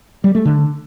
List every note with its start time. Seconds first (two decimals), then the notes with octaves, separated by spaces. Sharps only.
0.24 G3
0.35 A3
0.45 D3